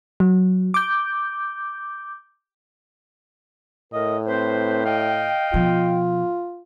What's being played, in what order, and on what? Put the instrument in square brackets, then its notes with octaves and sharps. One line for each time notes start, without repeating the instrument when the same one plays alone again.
[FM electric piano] F#3
D6 G6
[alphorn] A2 [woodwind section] A#4 D#5
[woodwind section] C4 B4 C5
D#5 F5 G5
[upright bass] B2 F3 [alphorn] F4